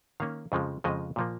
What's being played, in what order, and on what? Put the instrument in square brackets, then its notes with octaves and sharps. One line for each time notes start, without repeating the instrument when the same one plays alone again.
[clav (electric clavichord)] D#3 A#3 C#4 F5
F2 C#3 F3 G#3
F2 C#3 F3 G#3 D#5
A#2 F3 A#3